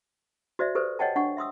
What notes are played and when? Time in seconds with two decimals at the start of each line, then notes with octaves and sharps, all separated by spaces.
0.59 F#4 C5 D5 E5
0.75 G4 A4 B4 C5
0.99 C#5 D#5 F#5 G5 A5
1.16 D4 F#5 G#5 C#6
1.37 E5 C6 D#6 E6